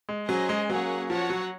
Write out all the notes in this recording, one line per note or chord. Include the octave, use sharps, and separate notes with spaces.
G#3
F#3 C#4 G#4 C5 D#5 G#5
G#3
F#3 A#3 C#4 G#4 C#5 F#5
F3 F#4 C#5 F#5
F#3